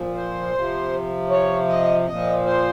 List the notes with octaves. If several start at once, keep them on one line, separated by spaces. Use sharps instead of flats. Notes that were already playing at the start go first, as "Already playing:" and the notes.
Already playing: A#2 F3
C5
C3 F3
C#5
D#5
A#2 F3 D#5
C5